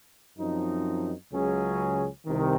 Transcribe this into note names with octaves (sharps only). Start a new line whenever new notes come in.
F#2 F3 C4 D#4
C#2 C#3 F#3 C#4 G#4
C2 C3 D#3